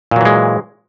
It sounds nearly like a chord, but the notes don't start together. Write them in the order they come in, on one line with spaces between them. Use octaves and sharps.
A#2 F#3 E3 G#3